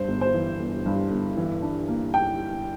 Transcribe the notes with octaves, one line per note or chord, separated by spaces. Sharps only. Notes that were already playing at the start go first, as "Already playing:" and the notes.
Already playing: G2 C5
G1
C5
E3
G1
G2
G1
E3
D4
A#3
G5